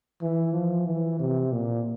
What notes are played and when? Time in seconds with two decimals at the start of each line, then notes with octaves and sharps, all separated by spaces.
0.22 E3
0.53 F3
0.87 E3
1.20 C3
1.52 A#2